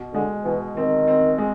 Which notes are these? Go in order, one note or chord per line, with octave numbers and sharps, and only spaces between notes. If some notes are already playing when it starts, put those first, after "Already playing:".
Already playing: B2
D3 G#3
B2 E3
D#3 C4
C4
G#3